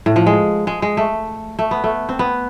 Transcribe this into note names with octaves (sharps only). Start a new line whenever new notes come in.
A2
F3
G#3
G#3
G#3
A3
A3
B3
A3
C4
B3